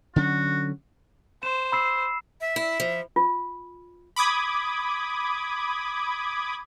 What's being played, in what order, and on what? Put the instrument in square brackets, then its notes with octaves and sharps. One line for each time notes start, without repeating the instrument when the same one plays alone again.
[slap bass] D3 F#3 C#4 [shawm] F#4
[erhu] C5 [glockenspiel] E7
[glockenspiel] B5 E6 C7
[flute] E5
[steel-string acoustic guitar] E4
F3
[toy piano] F4
[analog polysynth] B5 D6 D#6 G#6